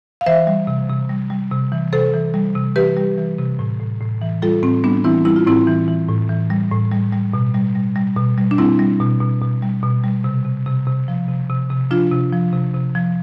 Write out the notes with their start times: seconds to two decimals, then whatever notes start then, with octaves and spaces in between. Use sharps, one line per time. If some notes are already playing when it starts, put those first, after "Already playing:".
0.21 F5
0.26 E3 C5 E5
0.47 G3
0.67 C3
0.89 C3
1.09 G3
1.30 G3
1.51 C3
1.72 E3
1.93 C3 A4 C5
2.14 E3
2.34 G3
2.55 C3
2.76 E3 G4 B4
2.97 G3
3.17 E3
3.38 C3
3.59 A2
3.80 A2
4.01 A2
4.22 E3
4.42 G3 F4 A4
4.63 A2 C4
4.84 G3 B3 D4
5.04 E3 C4 E4
5.25 G3 E4
5.36 F4
5.46 A2 C4 E4
5.67 E3
5.88 E3
6.09 A2
6.29 E3
6.50 G3
6.71 A2
6.92 G3
7.12 G3
7.34 B2
7.54 G3
7.75 G3
7.96 G3
8.16 B2
8.38 G3
8.51 D4
8.58 G3 C4 E4
8.79 G3
9.00 B2
9.21 B2
9.42 B2
9.62 G3
9.83 B2
10.04 G3
10.24 C3
10.45 C3
10.66 C3
10.87 C3
11.08 F3
11.28 C3
11.50 C3
11.70 C3
11.91 F3 D4 F4
12.11 C3
12.32 F3
12.53 C3
12.74 C3
12.95 F3